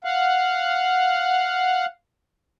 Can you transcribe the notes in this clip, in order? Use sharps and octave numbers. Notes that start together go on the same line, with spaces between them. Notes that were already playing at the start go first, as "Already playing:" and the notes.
F5 F#5